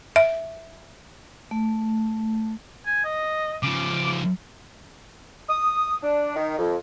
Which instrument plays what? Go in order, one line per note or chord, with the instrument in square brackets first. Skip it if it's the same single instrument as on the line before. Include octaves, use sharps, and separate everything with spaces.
[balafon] E5
[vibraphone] A3
[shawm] G#5
D#5
[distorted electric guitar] C#3 F3 [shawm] D6
[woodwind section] D#6
D4
D#3
F2